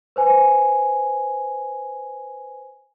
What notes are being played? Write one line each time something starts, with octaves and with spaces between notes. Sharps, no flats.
B4 C5 G#5